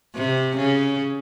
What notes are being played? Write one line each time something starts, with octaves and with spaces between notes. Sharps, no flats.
C3
C#3